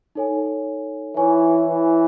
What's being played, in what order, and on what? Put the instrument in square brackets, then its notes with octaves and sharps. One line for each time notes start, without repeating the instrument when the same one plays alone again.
[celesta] D#4 A4 C#5 G#5
[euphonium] E3 [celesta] C#5 E5 G#5 C#6
[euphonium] E3